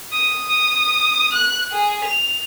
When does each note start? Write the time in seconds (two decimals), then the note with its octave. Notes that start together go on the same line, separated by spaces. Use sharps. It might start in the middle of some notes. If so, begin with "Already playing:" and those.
0.12 D#6
1.32 F#6
1.72 G#4
2.03 F7